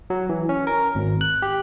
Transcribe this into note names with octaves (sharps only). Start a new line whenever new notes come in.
F#3
E3
C#4
A#4
G#1
F#6
G4